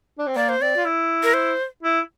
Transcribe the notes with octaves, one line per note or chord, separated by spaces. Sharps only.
D4
C4
A#3 D5
C5
C4 D5
F4
E4
A#4
C5
E4